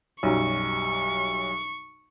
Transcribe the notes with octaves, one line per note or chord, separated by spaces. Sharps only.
B1 F#2 G3 C#6